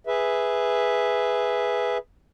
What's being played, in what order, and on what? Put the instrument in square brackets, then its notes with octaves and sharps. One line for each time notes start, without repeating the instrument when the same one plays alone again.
[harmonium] G#4 B4 E5